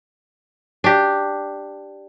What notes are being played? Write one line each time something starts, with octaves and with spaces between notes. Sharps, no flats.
D4 G4